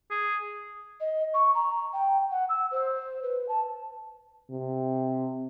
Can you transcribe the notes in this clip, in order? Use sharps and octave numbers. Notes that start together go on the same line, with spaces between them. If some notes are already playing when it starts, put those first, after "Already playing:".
G#4
D#5
C#6
A#5
G5
F#5
E6
C5
B4
A5
C3